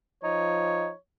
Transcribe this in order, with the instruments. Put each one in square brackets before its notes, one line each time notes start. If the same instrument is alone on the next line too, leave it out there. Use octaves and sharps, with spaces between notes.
[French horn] F3 [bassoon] D#4 [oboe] C#5